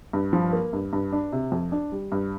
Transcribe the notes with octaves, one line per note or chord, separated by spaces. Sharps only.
G2
F3
A#3
G2
G2
D4
C3
F2
D4
G3
G2